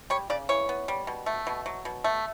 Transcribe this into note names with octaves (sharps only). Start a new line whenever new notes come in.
G3 C#5
C#3 D5
E3 C#5
B3
G3
B2
A3
B2
F#3
B2
A3